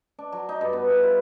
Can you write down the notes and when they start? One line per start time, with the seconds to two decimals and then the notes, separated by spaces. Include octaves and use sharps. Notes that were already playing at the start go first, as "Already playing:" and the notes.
0.18 D4
0.32 F#3
0.49 D#4
0.61 G2
0.73 B3
0.90 E5
1.03 F4